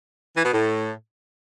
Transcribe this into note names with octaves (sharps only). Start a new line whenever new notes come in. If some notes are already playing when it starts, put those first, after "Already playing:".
E3
B2
A2